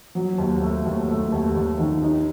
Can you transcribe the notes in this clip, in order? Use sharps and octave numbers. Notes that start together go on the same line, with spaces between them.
F#3
D#2
A3
D#2
A3
D#2
D#2
D#3
D#4